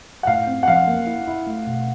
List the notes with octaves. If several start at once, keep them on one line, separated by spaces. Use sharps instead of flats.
F#5
A2 F5
C4
F#5
F3 F5
A#3
E4
E4
A3
B2